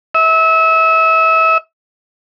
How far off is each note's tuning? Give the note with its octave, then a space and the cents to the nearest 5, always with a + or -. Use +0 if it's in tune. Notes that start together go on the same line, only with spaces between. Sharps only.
E5 -30